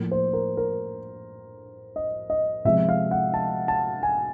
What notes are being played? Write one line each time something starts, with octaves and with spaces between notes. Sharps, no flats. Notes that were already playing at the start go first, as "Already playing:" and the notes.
Already playing: A2 F3 A#3
C5
A#4
A#4
D#5
D#5
C3 F3 G#3 B3 E5
F5
F#5
A5
A5
G#5